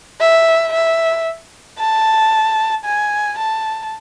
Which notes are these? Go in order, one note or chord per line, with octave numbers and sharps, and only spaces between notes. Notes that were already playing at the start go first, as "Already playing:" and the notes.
E5
E5
A5
G#5
A5